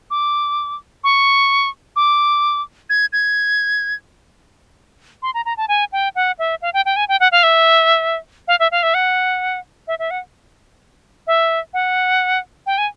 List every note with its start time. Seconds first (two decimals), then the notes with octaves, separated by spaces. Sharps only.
0.11 D6
1.04 C#6
1.96 D6
2.90 G#6
3.13 G#6
5.23 C6
5.34 A#5
5.45 A#5
5.57 A5
5.68 G#5
5.92 G5
6.15 F#5
6.39 E5
6.62 F5
6.74 G5
6.85 G5
6.96 G#5
7.08 G5
7.20 F#5
7.32 F5
7.43 E5
8.48 F5
8.60 E5
8.71 F5
8.83 E5
8.94 F#5
9.88 E5
9.99 E5
10.11 F#5
11.27 E5
11.74 F#5
12.66 G5
12.78 G#5